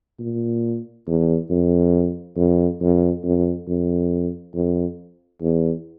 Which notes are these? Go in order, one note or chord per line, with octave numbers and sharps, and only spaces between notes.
A#2
E2
F2
F2
F2
F2
F2
F2
E2